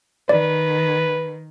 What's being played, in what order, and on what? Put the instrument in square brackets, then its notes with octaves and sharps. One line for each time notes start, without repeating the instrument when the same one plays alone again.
[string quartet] D#3 [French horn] B4 [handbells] D5